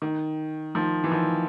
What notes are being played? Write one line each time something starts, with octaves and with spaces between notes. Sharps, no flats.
D#3
D#3 F3
E3
D#3 F3